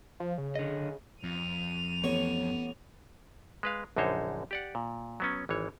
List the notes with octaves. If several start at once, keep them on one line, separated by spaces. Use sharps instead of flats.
F3
C#3
D3 D#5
F2 D#7 F7
A1 B3 C#5
G#3 B4 F5
A#1 F#2 D3 D#4 C5 C#5
G4 D5 F#5
A#2
F#3 B3 C#4
G#1 E3 C#5